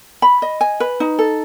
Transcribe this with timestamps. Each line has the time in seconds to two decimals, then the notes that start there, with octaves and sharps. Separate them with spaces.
0.22 B5
0.42 D#5
0.61 G#5
0.80 B4
1.00 D#4
1.19 A4